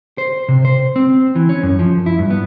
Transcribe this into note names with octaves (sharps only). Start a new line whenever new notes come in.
C5
C3
C5
C4
E3
C#4
F#2
F3
E4
G2
B3